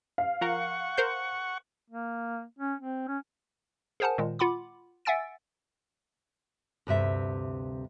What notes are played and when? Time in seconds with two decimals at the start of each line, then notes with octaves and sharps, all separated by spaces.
0.18 F5
0.41 F3 A#4 F#5 A#5 C#6
0.97 A#4 C5 G6
1.90 A#3
2.59 C#4
2.79 C4
3.08 C#4
4.00 G#4 A#4 C5 F#5 G#5 A5
4.18 A#2 D#3 G#3
4.39 F4 F#5 B5 D6
5.05 E5 F#5 G#5 E6 A6 D7
6.87 D2 G2 C3 E5